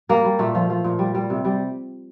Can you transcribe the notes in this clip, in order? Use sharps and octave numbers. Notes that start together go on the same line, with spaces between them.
G3 A#3
G3
A#2 A3
F3
F3
A#2
G3
G3
C3
G3